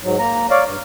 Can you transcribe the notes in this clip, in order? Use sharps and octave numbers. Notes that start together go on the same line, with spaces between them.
G#2 F#3
A#3 A#5
C#5 D5 F5
G2